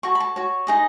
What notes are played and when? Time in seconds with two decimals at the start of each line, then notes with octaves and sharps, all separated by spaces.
0.03 F#4 A4 C#5 C#6
0.15 B5
0.20 A5
0.36 F#4 C#5
0.67 D#4 G#4 D#5